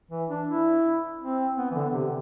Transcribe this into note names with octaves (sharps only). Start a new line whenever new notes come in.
E3
D4
E4
C4
B3
E3
D3
C3